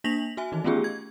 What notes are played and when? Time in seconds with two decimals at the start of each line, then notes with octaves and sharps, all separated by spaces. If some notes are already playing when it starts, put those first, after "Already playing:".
0.04 A#3 D4 A#6 B6 F7 F#7
0.37 F#4 E5 G#5
0.52 D#3 E3 D#4
0.64 A3 B3 C#4 F4 G4 G#4
0.84 G#6